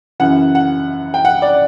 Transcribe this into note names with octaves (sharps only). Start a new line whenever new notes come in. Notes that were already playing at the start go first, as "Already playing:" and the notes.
F#2 C#3 E3 F#5
F#5
G5
F#5
D5